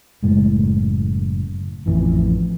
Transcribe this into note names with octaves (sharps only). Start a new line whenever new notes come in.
F#1 A2 G#3 A3
A1 F2 E3